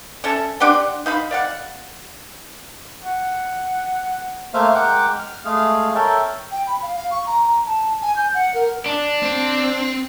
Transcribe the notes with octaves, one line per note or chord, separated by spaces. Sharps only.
C#4 A4 E5
D4 G4 F#5 C6
D#4 F5 B5
D5 F5 F#5
F#5
A3 A#3 C5 E5 F5
G#3 A#4 F#5 G5 D6
F6
G#3 A3 G#4 F5
A4 A#4 C#5 E5 G5 A5
G5
B5
F5
F5
C#6
A#5
A#5
A5
G#5
G6
F#5
A#4
D4
C4